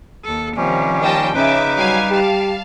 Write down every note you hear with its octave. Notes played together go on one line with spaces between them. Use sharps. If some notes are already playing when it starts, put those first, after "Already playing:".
D#2 A4
C3 D#3 F3 G3 C#4
D#2 D#5 G5 A5
C#3 C#4 D#4 B4 E5 D6
F#3 G3 F5 G#5
G4 F5 A5